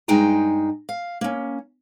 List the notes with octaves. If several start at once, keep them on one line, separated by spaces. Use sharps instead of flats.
G2 G#3 D#4 G5 G#5 A#5
F5
A#3 C#4